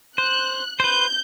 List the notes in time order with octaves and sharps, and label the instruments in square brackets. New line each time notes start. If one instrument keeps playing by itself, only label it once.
[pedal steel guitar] C5 [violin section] F#6
[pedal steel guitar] B4 C5 [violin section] G6